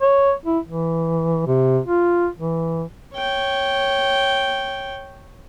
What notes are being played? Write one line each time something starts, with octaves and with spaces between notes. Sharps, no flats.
C#5
E4
E3
C3
F4
E3
C#5 G5